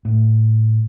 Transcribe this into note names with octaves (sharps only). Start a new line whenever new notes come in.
A2